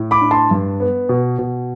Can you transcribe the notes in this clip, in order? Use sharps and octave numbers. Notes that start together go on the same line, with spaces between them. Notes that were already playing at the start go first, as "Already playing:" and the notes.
Already playing: A2
B5 D6
D4
A5 C6
G2
B3
B2
B2